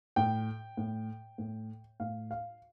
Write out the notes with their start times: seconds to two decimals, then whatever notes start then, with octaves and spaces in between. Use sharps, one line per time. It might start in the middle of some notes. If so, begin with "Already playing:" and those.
0.16 A2 G5
0.77 A2
1.38 A2
2.00 A2 F5
2.31 F5